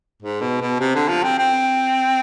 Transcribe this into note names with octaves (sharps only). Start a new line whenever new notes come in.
G#2
B2
B2
C3
D3
F3
C4
C4